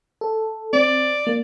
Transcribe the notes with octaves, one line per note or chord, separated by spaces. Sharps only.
A4
C4 D5
A#3